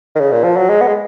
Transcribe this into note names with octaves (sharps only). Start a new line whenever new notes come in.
D#3
C#3
A#2
F3
F#3
G#3
B3
G#3